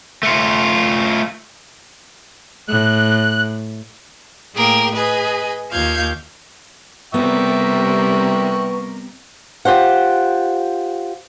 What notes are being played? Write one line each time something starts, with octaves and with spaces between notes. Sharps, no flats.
A3 F4
A2 F#6
A2 A#3 G#4 A#4 G5
G#4 B4 D#5 G#5
D#2 F4 F5 G6 G#6
C3 G3 B3 A#4 E5 G5 C#6
F4 G4 C5 F#5